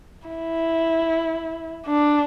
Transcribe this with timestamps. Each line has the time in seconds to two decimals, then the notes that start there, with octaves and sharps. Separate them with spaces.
0.28 E4
1.86 D4